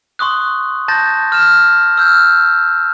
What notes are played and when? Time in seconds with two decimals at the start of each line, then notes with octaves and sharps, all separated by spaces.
0.19 C6 C#6 D#6 F#6
0.88 A5 C6 G6 A6 A#6
1.32 F6 E7
1.97 E6 F6 G6